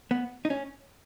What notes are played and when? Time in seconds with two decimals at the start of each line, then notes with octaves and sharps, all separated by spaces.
0.11 B3
0.45 D#4
0.50 C#4